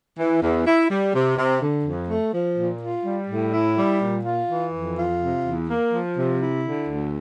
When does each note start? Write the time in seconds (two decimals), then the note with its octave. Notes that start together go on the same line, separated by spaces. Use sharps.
0.18 E3
0.41 E2
0.66 E4
0.90 G3
1.14 C3
1.37 C3
1.61 D3
1.85 F2
2.09 A3
2.33 F3
2.57 A#2
2.82 F4
3.05 G3
3.29 A2
3.53 E4
3.77 G3
4.01 A#2
4.25 F4
4.49 E3
4.73 F2
4.98 F4
5.21 C3
5.45 E2
5.69 A#3
5.93 F3
6.17 C3
6.41 E4
6.65 D3
6.88 D2